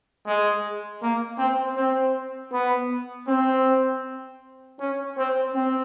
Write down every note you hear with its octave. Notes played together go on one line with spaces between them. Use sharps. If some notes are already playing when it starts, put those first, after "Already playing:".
G#3
A#3
C4
C4
B3
C4
C#4
C4
C4